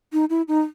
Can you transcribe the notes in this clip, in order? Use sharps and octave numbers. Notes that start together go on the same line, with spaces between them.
D#4
E4
D#4